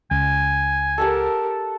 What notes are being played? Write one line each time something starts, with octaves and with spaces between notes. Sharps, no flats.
C#2 G#5
G4 A4 A#4 F#5 A5